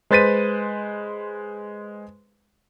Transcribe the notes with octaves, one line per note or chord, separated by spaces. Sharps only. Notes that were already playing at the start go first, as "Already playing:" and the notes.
G#3 B4 C5 A6 B6 D#7